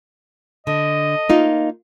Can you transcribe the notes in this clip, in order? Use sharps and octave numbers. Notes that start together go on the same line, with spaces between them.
D3 D#5
A#3 D#4 F4